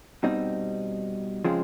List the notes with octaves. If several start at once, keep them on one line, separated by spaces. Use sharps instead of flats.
B2 G3 C4 D#4
C#3 F3 G#3 C4